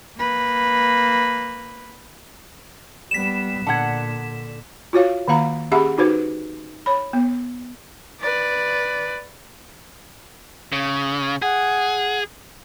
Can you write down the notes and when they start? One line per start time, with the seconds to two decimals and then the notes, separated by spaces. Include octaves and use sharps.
0.18 A#3 B4
3.11 G3 B3 B6 E7
3.67 A#2 D3 F#5 A5 G#6
4.93 F4 F#4 C#5 F5
5.28 D#3 A#3 F5 A#5
5.71 C#4 G4 G#4 E5 F#5 B5
5.98 D#4 F#4 B4 C5
6.86 C#5 B5
7.13 B3
8.21 B4 D5
10.72 C#3
11.42 G#4 F#5